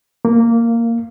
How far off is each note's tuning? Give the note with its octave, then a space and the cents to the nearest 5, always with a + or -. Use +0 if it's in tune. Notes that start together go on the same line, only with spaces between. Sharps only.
A#3 -10